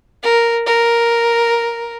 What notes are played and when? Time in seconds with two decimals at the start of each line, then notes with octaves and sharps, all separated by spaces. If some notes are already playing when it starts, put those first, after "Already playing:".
0.23 A#4
0.66 A#4